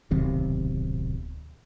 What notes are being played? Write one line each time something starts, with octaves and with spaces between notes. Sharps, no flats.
D1 B1 C3 D#3